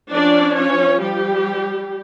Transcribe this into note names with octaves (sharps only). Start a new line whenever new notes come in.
F3 C#4 D4 D5
C#4 C#5
G3 G4